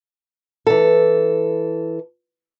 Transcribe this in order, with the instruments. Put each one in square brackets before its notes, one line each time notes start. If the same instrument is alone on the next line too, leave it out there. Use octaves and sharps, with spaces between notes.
[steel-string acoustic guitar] E3 A4